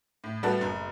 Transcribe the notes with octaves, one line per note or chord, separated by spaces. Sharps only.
A2
G3 B3 F#4 A4
F#1